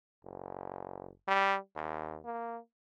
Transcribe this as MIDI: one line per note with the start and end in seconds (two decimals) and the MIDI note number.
0.24 1.09 30
1.28 1.57 55
1.76 2.20 39
2.25 2.58 58